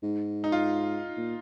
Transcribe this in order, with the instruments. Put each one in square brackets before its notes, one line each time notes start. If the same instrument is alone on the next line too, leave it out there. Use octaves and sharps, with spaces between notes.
[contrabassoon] G#2
[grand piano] D#4
F4
[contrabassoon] A#2